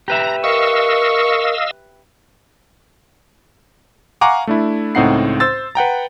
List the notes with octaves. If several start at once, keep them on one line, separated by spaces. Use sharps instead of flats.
G4 B4 E5 A#5
A#4 D#5 F5 C#6 E6
F5 F#5 G#5 A#5 C#6 D6
A3 D4 E4
C#2 A2 C4 D#4 F#5 C7
C5 E6 A6
B4 F#5 G5 A#5